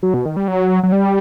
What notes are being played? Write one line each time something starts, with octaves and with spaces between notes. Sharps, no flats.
F#3
B2
D#3
G3
F#3
F#3
G3